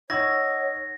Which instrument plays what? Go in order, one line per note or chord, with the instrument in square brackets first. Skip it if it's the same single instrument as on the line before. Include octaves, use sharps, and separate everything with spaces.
[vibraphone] D#4 D#5 F#5 [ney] C#5 [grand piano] C#6 E6 G#6 [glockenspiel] A#6